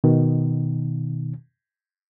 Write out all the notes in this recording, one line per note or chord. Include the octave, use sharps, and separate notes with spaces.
B2 D#3